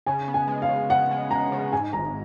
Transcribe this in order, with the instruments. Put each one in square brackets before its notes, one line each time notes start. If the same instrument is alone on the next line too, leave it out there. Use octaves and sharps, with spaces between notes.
[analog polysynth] C#3 [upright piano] G#5
[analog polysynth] B3
[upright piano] G#5
[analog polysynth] G#3
[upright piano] F5
[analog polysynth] C#3
[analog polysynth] C#3 [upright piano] F#5
[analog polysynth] G#3
[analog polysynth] G#3 [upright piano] A#5
[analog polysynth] C#3
[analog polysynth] G#2 [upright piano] G#5
[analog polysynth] G#1 [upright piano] A#5